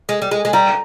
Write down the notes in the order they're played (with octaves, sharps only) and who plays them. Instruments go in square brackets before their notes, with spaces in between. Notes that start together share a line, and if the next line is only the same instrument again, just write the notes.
[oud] G#3
G3
G#3
G#3
[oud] G3 [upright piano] A#5